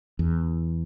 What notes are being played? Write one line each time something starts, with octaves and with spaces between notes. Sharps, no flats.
E2